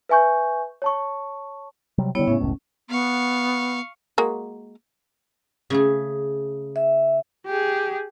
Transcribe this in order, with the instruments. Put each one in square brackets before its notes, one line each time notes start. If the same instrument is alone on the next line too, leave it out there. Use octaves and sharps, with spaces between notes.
[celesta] B4 E5 G#5 C#6 G6
C#5 A5 C#6
[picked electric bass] C3 F#3 G3
[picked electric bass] D3 G3 [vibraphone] B3 E4 C#5
[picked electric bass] A2 C#3 [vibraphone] C#4
[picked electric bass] F#1 C#2 A2
[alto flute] B3 [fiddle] F5 C#6
[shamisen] G#3 A#3 F#4
[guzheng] C#3 A3 G#4
[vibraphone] E5
[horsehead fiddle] G4 G#4